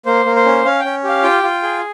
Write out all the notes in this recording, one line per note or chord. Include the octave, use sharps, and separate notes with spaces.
A#3 C5
A#3
C5
C#4
C#4 F5
C#4 G5
G4 F5
F4 G5
F4
G#4